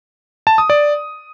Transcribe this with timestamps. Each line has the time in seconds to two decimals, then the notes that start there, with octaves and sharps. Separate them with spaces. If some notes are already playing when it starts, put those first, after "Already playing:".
0.47 A5
0.58 D#6
0.70 D5